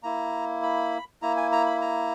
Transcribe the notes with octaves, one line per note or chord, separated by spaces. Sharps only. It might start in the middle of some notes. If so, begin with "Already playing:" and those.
A#3 E4 A#5
B5
A#3 E4 A#5
G#5
A#5
B5
A#5